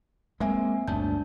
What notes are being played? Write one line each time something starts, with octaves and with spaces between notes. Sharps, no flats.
G#3 A#3 C4 E5 G#5
G1 D2 D4 A5 G6